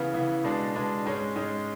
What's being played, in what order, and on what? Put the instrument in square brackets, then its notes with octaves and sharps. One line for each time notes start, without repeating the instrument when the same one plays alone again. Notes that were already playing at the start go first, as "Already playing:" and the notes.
Already playing: [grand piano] C#3 E3 B3
C#3 E3 B3
B2 G#3 D4
B2 G#3 D4
G#2 G#3 C#4
G#2 G#3 C#4